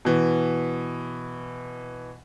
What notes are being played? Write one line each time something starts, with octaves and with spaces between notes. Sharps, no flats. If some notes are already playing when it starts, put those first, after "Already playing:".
B2 E3